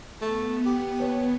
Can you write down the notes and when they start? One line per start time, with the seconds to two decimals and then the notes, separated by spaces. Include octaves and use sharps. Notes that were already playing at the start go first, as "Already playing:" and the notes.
0.22 A3 B3
0.66 G4
0.98 D#2 B4 C#5